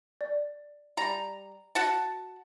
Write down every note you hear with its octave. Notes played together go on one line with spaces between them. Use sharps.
D5
G3 A#5
F#4 F#5 A5